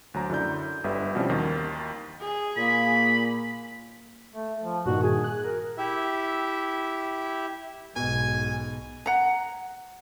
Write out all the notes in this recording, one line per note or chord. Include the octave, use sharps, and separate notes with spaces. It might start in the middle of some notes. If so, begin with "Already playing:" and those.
D2 F#3 A#5
F#2 D3 E4 D5 G6
G1 D3 G3 B4 E5
B2 E3 F3 G3 C4 C#4
D#2 D#3
G#4
A#2 A#3 B5
A3
F3
G2 A#2 D#3 F#4
G#4
F#6
A#4
E4 G4 E5
B1 G#2 B2 G#5
F#5 A#5